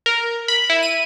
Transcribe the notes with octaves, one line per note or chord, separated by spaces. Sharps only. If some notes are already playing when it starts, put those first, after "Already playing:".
A#4
B5
E4
D#7